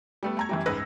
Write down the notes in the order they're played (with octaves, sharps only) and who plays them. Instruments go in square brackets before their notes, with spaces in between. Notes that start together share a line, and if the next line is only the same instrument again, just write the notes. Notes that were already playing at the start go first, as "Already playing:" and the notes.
[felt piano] G3 A3 B3
A3 A#5 G#6
F#2 E3 G3
C#2 G#2 B4 E6 A#6